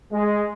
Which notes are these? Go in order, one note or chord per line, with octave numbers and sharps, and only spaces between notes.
G#3